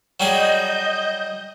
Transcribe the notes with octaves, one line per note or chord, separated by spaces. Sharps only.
F#3 G3 G#4 D#5 G6